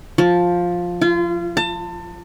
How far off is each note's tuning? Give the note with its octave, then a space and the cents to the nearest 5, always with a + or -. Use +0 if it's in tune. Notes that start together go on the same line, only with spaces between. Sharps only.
F3 +10
F4 -30
A5 +30